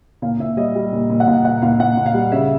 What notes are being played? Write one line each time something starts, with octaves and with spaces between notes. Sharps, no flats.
A#2 F5
A#2 E5
G3 D#5
G3
A#2
A#2
F#5
A#2 F5
A#2 F#5
A#2 F5
A#2 F#5
A#2
F5
G3
C#3 E5